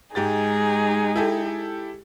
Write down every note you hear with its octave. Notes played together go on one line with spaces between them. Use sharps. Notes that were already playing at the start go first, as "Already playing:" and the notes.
G#2 G#3 D#4 G4 G#4 A6
E4 G4 A4